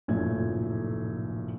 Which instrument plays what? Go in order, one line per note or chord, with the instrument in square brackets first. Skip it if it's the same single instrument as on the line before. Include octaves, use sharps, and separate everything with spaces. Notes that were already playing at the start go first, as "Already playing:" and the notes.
[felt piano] F1 A#1 F#2 A2 A3 G#6